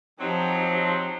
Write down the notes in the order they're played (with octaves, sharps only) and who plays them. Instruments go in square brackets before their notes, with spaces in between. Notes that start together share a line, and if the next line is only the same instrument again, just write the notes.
[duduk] F3 [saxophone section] F#3 C4 [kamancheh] D#4 G4